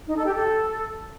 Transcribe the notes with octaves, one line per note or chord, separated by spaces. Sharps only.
D#4
A4
G4
A4